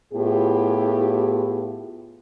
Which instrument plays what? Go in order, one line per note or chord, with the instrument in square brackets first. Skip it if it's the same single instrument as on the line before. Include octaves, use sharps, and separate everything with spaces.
[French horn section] A2 B3 E4 F4 G4 G#4